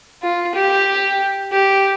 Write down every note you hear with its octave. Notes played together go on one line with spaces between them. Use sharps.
F4
G4
G4